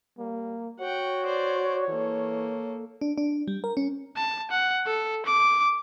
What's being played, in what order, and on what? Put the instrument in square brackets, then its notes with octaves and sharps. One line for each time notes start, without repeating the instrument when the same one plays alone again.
[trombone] G3 [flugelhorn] A#3
[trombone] F#4 [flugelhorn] C#5 [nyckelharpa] F#5 G5
[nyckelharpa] C5 D5
[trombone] E3 [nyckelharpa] A#3 A4
[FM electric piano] D4
D4
G3
A#4
C#4
[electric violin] A5
F#5
A4
D6